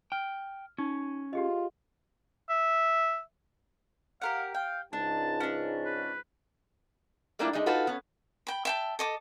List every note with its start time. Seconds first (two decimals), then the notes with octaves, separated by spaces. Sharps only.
0.12 G5 F6
0.78 C#4 D#4
1.33 F4 G4 G#4 D#5
2.50 E5
4.21 G4 A#4 F5 F#5
4.55 F5 G5
4.93 C#2 G#2 D4 A5
5.40 C#4 D4
5.85 B4
7.39 G3 A3 A#3 D4 E4 F4
7.53 G#3 A3 D#4
7.66 D#4 F4 F#4 A4 B4
7.87 B3 C#4
8.47 G5 B5
8.65 E5 G5 A5
8.99 A4 D#5 D6